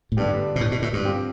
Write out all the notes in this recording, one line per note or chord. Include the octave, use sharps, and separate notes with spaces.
A2
G2 D3 G3 B3 D4 G4
B2
A2
B2
A2
G2
F3 C4 G4